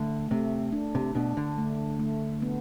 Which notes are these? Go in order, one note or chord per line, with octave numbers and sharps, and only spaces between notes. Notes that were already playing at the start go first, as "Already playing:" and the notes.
Already playing: D3 A3
C3 A3
D4
C3
B2 D4
D3
A3
A3
B3